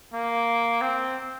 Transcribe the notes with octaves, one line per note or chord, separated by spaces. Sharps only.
A#3
C4